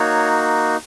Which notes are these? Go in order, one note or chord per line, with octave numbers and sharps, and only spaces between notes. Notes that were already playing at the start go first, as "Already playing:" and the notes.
Already playing: A#3 D#4 F#4 C#5